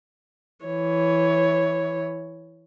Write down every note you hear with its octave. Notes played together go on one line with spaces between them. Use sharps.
E3 C#5